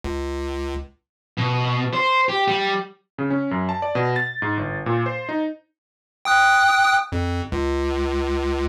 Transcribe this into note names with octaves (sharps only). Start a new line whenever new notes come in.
C#2
B2
C5
G4
G3
C#3
C#4
F#2
A5
D5
B2
A6
G#2
G1
A#2
C5
D#4
G5 D#6 F#6
F2
C#2